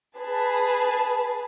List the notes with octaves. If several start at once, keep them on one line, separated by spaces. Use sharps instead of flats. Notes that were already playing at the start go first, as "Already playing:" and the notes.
G#4 B4 A5